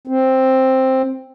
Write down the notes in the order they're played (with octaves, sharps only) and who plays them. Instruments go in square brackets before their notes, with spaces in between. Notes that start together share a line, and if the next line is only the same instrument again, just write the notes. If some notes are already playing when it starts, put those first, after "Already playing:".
[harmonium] C4